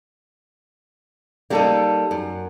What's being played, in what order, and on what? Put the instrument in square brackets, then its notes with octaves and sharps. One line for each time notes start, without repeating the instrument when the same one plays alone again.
[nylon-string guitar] G3 A#3 [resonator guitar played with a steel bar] D#4 A4 D5
[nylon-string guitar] F#2